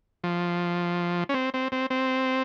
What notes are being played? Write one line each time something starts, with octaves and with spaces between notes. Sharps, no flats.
F3
C#4
C4
C4
C4
C4